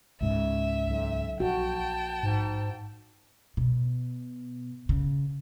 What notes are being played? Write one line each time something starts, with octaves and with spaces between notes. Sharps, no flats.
C#2 G#2 C#3 E5
B1
A#1 F#4 G5 A5
G#2
B2
C#3